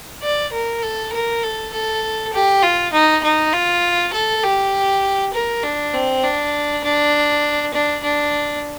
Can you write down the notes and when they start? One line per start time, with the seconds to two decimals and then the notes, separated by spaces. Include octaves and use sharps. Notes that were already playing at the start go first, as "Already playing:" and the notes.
0.22 D5
0.52 A#4
0.82 A4
1.12 A#4
1.42 A4
1.72 A4
2.33 G4
2.63 F4
2.93 D#4
3.23 D#4
3.53 F4
4.13 A4
4.43 G4
5.33 A#4
5.63 D4
5.94 C4
6.23 D4
6.84 D4
7.73 D4
8.03 D4